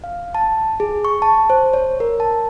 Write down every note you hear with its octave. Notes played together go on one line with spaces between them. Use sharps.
F5
A5
G#4
C#6
A5
C5
C#5
A#4
A5